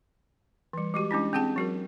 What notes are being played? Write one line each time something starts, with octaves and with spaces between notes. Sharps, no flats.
E3 G3
G#3 F#4 G4
G#3 C#4 D4 E4
C4 D4 G#4 F#5 A5
F#3 F#4 A#4